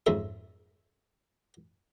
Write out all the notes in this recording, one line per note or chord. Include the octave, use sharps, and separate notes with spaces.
F2 G#2 C#3 E5